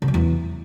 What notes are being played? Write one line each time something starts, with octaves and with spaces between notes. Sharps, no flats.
C#3
F#3
E2